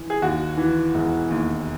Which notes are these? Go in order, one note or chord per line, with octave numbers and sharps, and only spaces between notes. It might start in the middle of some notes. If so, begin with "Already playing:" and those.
Already playing: E3
G#4
D#2 F#4
E3
E1
D#2